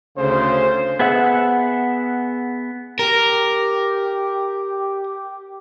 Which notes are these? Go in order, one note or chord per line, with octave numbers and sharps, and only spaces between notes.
D2 C#3 C5
B3 G#4 E5 F#5
G4 A#4